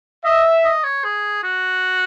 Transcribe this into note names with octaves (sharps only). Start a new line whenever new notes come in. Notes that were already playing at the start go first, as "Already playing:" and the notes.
D#5 E5
D#5
C#5
G#4
F#4